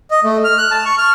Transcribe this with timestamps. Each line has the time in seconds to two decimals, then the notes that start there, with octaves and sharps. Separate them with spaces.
0.11 D#5
0.24 A3
0.44 F6
0.58 F#6
0.71 A5
0.85 C#6
0.98 F6